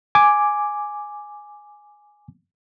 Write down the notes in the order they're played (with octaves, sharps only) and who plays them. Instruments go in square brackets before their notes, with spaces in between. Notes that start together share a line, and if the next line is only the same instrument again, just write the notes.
[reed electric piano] G#5 D6